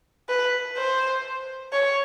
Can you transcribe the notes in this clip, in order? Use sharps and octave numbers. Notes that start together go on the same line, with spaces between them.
B4
C5
C#5